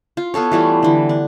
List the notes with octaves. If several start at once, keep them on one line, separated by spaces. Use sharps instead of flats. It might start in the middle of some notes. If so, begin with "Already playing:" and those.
F4
B3 F4 A4 C#5
E3 G3 A3 F4
D3 E3
D4